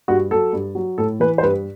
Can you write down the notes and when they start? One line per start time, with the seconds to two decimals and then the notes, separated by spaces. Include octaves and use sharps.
0.08 G2 F#4
0.31 F#3 A4
0.53 G2
0.75 F#3
0.98 A2 A4
1.20 E3 B4
1.38 C5
1.43 G2 B4